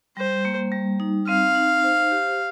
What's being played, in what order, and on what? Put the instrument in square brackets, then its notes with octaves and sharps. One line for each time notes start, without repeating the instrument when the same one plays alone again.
[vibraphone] G3 [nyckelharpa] C5
[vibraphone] A#3
G3
D#4
[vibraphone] C4 [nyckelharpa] F5
[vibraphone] D#4
C5
G4